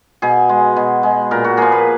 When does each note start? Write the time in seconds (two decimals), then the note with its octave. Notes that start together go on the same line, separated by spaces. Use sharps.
0.22 B2 G#4
0.49 G#3
0.76 B2
1.03 G#3
1.31 A#2 A#4
1.44 F#4
1.57 F3 A#3 G#4
1.72 B4